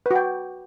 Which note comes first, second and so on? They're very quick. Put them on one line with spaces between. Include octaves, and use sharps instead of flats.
B4 F#4 G5